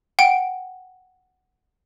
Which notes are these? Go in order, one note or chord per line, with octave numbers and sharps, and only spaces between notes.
F#5 G5 D7